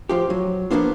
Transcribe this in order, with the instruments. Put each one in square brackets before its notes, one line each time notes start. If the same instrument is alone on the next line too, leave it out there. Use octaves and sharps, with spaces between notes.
[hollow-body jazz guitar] F3 F4 G4
F#3
F3 A#3 B3 D4 F4